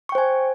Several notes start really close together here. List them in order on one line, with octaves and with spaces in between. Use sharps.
C#6 G5 C5 G#5